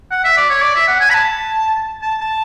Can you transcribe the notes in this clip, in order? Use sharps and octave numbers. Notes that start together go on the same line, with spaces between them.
F#5
E5
D5
C#5
D5
E5
F#5
G#5
B5
A5
A5
A5